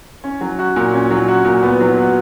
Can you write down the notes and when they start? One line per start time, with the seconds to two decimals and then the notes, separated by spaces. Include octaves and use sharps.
0.24 C#4
0.41 F#3
0.59 F#4
0.76 A#2
0.93 C#4
1.11 F#3
1.28 F#4
1.45 A#2
1.63 B3
1.80 F#3
1.98 F#4